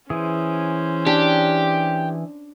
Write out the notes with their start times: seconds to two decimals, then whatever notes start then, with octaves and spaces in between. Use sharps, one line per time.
0.10 E3 C#4 G#4 C5
1.07 D4 G4